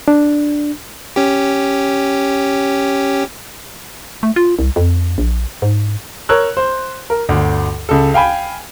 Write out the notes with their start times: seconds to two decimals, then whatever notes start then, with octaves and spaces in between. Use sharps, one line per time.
0.08 D4
1.16 C#4 G4
4.23 A3
4.36 F4
4.59 C2
4.76 F2
5.18 A#1
5.62 G#2
6.29 A#4 C#5 E6 F#6
6.57 C5
7.10 A#4
7.29 G1 D2
7.89 C#2 A4
8.14 F5 G5 G#5 B5